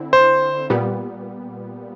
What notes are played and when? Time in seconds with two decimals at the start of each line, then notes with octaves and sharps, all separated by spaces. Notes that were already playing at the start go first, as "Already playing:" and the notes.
Already playing: D3 C4 E4
0.13 C5
0.70 A#2 G3 B3